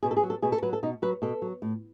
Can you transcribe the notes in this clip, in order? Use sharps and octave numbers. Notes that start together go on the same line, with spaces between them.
B2 G#4
A4
G#4
F#3
A4
B2 G#4
A4
F#3 B4
A4
B2 D#4
F#3 B4
B2 A4
F#3
A2